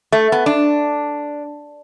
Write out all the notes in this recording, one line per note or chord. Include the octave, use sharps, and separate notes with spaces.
A3
B3
D4